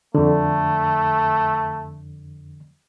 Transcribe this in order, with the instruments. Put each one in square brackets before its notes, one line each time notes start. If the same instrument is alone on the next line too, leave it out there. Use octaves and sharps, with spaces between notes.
[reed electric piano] F2 D3 [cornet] A3